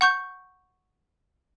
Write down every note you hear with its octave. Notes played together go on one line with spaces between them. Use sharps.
F#5 C#6 G6